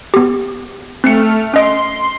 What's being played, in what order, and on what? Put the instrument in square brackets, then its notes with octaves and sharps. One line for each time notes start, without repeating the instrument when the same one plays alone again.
[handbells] B3 G4
[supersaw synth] A3 F6 [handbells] C4 C7 C#7
[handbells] C#4 D#5 D7 [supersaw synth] C6